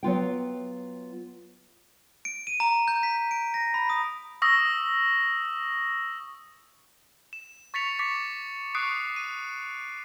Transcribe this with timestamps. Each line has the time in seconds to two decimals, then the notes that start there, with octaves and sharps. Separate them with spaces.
0.03 F#3 B3 F4 G5
2.25 D7
2.47 D#7
2.60 A#5
2.88 G6
3.03 B6
3.31 D7
3.54 A#6
3.74 B5
3.90 D#6
4.42 C#6 D#6 E6 A#6
7.33 E7
7.74 C#6 A6 B6 C#7 F7
7.99 C#6 D6 A6 B6 C#7
8.75 C#6 D#6 F#6 C7 D7
9.16 D#7